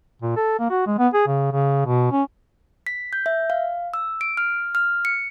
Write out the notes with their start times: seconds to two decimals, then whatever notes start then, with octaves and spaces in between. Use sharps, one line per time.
0.22 A#2
0.36 A4
0.59 A#3
0.70 F#4
0.86 G#3
0.98 B3
1.14 G#4
1.27 C#3
1.52 C#3
1.86 B2
2.12 C#4
2.87 B6
3.13 G6
3.26 E5
3.50 F5
3.94 E6
4.21 D7
4.37 F6
4.75 F6
5.05 C#7